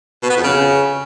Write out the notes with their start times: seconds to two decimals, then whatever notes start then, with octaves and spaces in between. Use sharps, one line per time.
0.23 B2
0.30 B3
0.37 F2
0.44 C#3